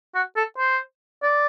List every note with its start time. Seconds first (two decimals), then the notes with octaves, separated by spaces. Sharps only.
0.15 F#4
0.37 A4
0.58 C5
1.23 D5